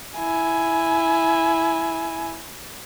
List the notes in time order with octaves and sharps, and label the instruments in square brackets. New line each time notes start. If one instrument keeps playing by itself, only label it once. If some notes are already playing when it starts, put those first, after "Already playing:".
[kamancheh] E4 G#5